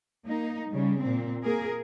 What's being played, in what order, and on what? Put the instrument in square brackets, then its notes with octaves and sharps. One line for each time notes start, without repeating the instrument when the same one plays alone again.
[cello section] A#3 D#4
C#3 G3
A#2 C4
A#3 G#4 A#4